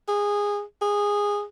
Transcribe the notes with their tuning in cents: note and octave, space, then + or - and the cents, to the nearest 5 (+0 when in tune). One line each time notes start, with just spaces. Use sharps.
G#4 -20
G#4 -15